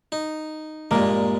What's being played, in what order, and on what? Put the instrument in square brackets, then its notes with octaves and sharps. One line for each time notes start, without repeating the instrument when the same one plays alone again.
[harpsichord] D#4
[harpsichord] G2 A#2 G#3 [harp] A#3